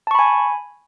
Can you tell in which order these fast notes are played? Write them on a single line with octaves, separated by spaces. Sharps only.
A5 C#6 B5 G#5